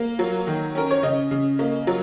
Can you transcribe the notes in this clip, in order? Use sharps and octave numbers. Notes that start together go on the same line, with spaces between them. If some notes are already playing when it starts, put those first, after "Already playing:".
Already playing: A#3
F#3
D#3
C#4 A#4
C#5
C#3 D#5
C#3
A#3
F#3